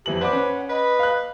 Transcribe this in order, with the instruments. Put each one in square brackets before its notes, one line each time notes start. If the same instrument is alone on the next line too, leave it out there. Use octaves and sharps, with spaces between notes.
[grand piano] F2 E3 F#7 [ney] G4
[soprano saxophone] B4 [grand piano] C5 D5 D6 [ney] F#5
[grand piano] C#4
[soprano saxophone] B4 [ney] D#5
[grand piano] F5 F#6